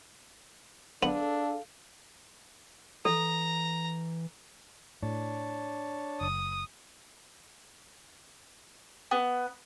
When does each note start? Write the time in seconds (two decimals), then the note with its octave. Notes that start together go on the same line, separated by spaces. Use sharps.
1.03 B3 D4 G#4 A4 F5
3.05 E3 A4 A#5
5.03 A2 D4 C#5 A5
6.21 F#1 D#6
9.11 B3